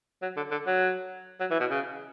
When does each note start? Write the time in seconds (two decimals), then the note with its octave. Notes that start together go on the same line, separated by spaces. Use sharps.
0.22 F#3
0.37 D3
0.51 D3
0.67 F#3
1.40 F#3
1.51 E3
1.60 B2
1.70 C#3